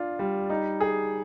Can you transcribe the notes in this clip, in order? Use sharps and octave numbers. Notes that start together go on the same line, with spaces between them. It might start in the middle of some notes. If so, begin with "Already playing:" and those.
Already playing: D4 F4
G3
D#4
G#4